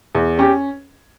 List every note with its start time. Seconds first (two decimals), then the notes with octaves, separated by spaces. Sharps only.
0.15 E2
0.39 C#4 G4